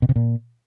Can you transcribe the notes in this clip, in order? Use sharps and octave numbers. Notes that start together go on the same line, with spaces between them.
B2
C3
A#2